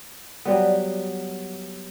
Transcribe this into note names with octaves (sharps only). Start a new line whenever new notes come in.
F#3 G3 B3